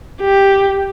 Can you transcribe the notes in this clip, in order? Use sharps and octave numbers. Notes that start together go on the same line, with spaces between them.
G4